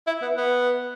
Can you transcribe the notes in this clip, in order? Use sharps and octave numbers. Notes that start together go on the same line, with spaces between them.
E4
B3
B3